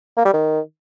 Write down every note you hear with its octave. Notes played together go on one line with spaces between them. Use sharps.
A#3
G3
D#3